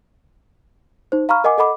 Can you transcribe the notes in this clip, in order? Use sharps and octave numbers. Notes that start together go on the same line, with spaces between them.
D#4 C5
F5 A#5 B5 C#6 F6
A#4 D#5 F#5 G#5 D6
A4 D#5 F#5 B5 D6